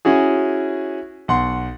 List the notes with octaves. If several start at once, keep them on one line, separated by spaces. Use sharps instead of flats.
C#4 E4 F#4 G#4
B1 F#5 C6